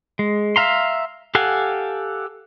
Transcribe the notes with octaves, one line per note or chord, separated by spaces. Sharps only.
G#3
E5 F5 A#5 C6
G4 A4 F5 F#5 G#5